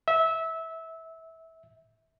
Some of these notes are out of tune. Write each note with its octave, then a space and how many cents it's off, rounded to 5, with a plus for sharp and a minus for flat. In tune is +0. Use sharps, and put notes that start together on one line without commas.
E5 -20